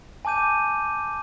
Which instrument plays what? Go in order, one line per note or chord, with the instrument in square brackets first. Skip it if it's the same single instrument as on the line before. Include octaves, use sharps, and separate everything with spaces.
[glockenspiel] G#5 A5 D6 G6 D#7